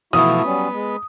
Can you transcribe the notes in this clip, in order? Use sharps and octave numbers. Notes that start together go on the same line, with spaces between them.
B2 E3 F3 A3 E4 F#4 D#6
F#3 G3 B3 C#4
G#3